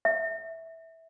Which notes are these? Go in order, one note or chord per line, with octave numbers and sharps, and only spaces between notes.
E5